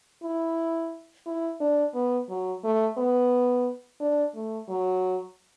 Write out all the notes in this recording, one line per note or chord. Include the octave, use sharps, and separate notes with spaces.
E4
E4
D4
B3
F#3
A3
B3
D4
A3
F#3